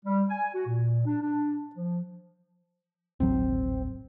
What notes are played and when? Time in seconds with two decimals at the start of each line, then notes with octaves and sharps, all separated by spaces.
0.06 G3
0.30 G#5
0.54 F#4
0.67 A#2
1.06 D4
1.22 D4
1.76 F3
3.20 D1 G#1 F#3 C4